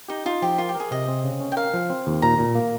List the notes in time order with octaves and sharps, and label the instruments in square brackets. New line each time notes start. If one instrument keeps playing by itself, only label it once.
[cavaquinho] D#4 [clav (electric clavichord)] G4
[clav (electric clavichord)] D#4 [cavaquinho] F4
[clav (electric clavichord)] F3 [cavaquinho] G4
[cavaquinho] F4 [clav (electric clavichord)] A#4
[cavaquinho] G4
[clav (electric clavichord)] A#4
[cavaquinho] G#4
[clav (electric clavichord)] C3 [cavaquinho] D#5
[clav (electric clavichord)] C4
C#3
C#4
[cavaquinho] G5
[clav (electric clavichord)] A#4 [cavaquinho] F5
[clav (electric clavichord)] F3
C4
D#2
[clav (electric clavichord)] A#2 [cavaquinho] A#5
[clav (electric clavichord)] A#2
A#3